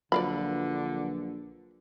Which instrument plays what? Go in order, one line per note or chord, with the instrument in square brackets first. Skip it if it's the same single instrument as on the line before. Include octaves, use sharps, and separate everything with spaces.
[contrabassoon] A#1 [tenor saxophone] D3 [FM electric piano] F#3 F4 B4 [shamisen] D5 F5 B5